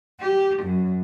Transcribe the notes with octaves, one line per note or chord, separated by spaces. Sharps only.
G4
F#2